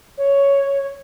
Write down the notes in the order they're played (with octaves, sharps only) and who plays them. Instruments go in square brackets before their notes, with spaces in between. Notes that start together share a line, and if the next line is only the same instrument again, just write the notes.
[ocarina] C#5